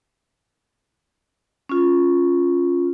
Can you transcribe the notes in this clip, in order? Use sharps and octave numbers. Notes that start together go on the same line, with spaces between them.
C#4 F4